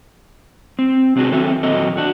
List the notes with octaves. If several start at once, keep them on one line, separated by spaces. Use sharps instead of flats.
C4
C3 C4 D4 E4 F#4 G#4
D#3 F#3 C4 A4 E5
A#2 D#3 F#3 C4 A4 D#5
D4 F#4